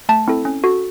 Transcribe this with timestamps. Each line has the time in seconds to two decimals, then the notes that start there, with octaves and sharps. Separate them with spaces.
0.09 A3 A5
0.28 C4 E4 A4
0.45 C#4
0.64 F#4 A4